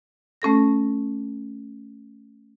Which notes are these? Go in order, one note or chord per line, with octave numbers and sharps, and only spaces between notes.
A3 C#4 A4 A#6